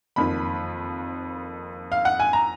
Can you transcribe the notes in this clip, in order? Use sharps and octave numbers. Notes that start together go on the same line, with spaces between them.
F#1 F2 D#3 B5
F5
F#5
G#5
A#5